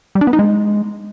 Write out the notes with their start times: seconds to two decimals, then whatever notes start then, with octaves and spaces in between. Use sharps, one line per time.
0.15 G3
0.21 D4
0.27 B3
0.33 D#4
0.39 G#3